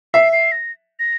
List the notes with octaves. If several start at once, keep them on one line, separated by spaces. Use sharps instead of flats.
E5 C7
C7
A#6
A#6